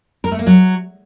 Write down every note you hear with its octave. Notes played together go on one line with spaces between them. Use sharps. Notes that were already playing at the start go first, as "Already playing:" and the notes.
A#4
A3
A#3
F#3